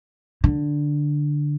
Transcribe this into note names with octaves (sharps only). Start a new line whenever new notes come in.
D3